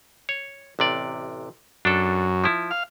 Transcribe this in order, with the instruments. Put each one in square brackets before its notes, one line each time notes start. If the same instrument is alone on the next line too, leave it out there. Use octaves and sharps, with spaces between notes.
[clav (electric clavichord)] C#5
A1 C3 D5
[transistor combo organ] F#2 [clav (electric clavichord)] D4 A4
[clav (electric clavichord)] F3 E4
[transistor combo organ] F5